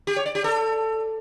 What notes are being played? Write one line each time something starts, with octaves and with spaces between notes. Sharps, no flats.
G4
C#5
D5
G4
A4